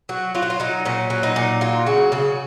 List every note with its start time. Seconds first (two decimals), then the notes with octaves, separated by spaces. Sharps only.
0.09 F#3 F#4
0.35 F#3 F4
0.42 F#4
0.50 F4
0.60 F#3 D#4
0.85 A#2 C#4
1.10 F#3
1.23 D#4
1.36 A#2
1.61 F#3 F4
1.86 C#3 F#4
2.12 C#3 F#4